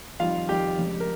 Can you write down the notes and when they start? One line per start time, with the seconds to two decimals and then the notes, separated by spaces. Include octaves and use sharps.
0.20 F2 D#3 G3 F4 F5
0.49 F2 D#3 G3 G4 G5
0.78 F1 F2 C#3 G#3
1.00 A#4